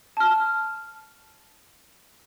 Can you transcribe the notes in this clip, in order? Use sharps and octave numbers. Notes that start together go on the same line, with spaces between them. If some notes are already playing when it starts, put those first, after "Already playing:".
A5 F6